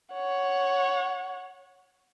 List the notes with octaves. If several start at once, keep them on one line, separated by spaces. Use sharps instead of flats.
C#5 F#5